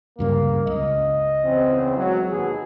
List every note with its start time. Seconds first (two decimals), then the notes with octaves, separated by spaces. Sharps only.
0.19 D2 G2 C#3 A#3
0.67 C#2 D#5
1.44 E2 C#3 C4
1.97 F#3 G#3
2.31 D#2 B2 G#4